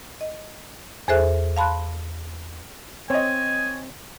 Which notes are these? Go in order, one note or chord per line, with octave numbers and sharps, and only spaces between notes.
D#5
E2 G#4 A4 C5 E5 F#6
F5 A5 B5 C6 F#6
C4 C#5 D#5 G#5